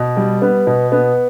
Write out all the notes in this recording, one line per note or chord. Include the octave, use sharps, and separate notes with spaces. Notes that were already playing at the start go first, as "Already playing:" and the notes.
Already playing: B2
G3
B3
B2
B3